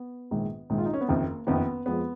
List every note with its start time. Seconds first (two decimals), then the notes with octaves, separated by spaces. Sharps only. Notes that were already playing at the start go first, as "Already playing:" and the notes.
Already playing: B3
0.31 A#1 G#2 D#3 G#3
0.70 A#1 G#2 D#3 G#3
0.78 F4
0.86 D#4
0.94 C#4
1.01 B3
1.08 F#1 F2 D#3 A#3
1.47 F#1 F2 D#3 B3
1.86 F2 F3 G#3 B3